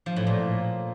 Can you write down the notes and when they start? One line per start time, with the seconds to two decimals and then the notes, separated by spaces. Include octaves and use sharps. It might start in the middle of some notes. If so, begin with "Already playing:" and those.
0.06 F3
0.16 A2
0.27 A#2